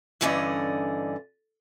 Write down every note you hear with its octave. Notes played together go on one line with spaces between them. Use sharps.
G2 D3 E3 C#4 D5 D#5